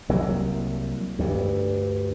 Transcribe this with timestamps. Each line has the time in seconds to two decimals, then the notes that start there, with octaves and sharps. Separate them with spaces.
0.09 C2 F#3 A#3
1.19 D2 G2